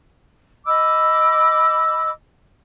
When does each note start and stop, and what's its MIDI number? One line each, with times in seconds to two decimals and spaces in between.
0.64 2.08 75
0.64 2.08 83
0.64 2.08 86
0.64 2.08 88